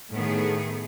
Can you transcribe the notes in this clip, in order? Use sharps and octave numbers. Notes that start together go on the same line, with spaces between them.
A2 D#3 A3 B3 G#4